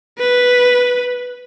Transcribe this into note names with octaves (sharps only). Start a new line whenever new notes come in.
B4